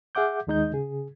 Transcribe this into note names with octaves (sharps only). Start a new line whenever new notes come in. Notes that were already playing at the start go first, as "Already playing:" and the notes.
G#4 E5 F#5 D6 G6
D#2 D#3 G#3 D#4 D#5 G6
C#3 G#4